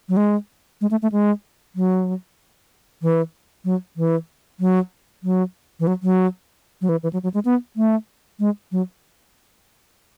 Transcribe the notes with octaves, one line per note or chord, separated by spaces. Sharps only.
F#3
G#3
G#3
A3
A3
G#3
F#3
E3
F#3
E3
F#3
F#3
E3
F#3
F#3
F#3
E3
E3
F#3
F#3
G#3
B3
A3
G#3
F#3